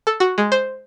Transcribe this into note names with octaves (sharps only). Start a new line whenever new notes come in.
A4
F#4
G#3
C5